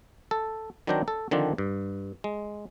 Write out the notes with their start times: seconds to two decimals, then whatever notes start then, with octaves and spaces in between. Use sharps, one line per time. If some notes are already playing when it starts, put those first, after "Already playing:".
0.31 A4
0.87 D#3 F#3 C4 D4 G5 A#5
1.08 A4
1.31 D3 D#3 F3 C4 D4
1.58 G2
2.24 G#3